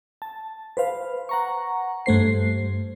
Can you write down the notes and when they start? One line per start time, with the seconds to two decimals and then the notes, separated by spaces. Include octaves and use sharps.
0.22 A5
0.77 B4 C5 F5
1.29 F#5 A#5 C#6
2.06 G2 A3 C5 C7